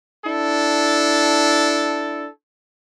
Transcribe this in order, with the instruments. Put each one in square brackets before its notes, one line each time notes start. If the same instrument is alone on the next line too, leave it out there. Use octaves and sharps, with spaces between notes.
[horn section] D4 E4 A4